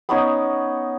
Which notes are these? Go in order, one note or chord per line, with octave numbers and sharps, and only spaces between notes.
B3 C#4 D#4 C#5